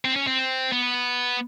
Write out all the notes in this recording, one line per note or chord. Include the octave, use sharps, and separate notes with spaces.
C4
C#4
C4
B3